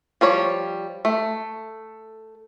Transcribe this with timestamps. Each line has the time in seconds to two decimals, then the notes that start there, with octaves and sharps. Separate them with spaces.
0.21 F3 G3 C#5
1.05 A3